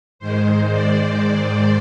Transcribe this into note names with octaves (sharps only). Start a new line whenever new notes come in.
G#2 D#3 G#3 C5
D5